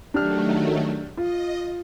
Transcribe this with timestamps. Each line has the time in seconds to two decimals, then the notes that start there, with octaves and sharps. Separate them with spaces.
0.14 D#3 F#3 A3 D4 G4 F6
1.17 F4 D#5